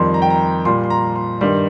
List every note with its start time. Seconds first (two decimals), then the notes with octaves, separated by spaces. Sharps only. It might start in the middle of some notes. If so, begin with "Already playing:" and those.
Already playing: F2 D#3 G3 C6
0.14 A#5
0.22 G5
0.30 A#5
0.65 A#2 G3 C6
0.84 C6
0.90 A#5
1.16 C6
1.41 G2 D#3 G3 C6